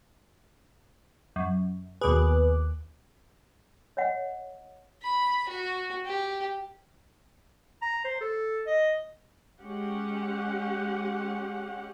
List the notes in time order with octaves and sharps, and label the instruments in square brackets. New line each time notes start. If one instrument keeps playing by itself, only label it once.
[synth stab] F#2
[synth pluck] D#2 D6 F#6 [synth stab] B2 G#4 [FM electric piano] B4
[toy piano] C#5 D#5 E5 F#5
[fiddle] B5
F#4
G4
[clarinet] A#5
C5
A4
D#5
[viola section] G#3 C#4 G4 F#5